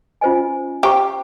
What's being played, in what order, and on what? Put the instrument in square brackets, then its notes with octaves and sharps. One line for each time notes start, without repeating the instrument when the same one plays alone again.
[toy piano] C#4 F4 C5 D#5 G#5
[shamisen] G4 [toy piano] C5 G5 A#5 C#6